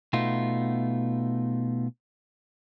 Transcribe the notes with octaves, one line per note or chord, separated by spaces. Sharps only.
B2 A3 B3 D#4 F4